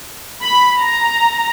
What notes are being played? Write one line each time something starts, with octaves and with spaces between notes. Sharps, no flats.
B5
A#5